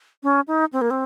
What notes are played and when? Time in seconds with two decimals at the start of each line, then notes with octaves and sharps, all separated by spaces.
0.23 C#4
0.48 D#4
0.73 C4
0.81 A#3
0.91 C4